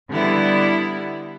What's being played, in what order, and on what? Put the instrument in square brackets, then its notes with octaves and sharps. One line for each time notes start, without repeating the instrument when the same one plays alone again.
[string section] D3 G3 B3 E4